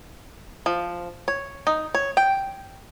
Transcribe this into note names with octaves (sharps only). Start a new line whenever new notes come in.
F3
C#5
D#4
C#5
G5